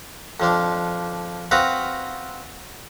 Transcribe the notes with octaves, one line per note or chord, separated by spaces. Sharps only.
F2 F3 D4
C4 F#4 B4 F5 A#5 D#6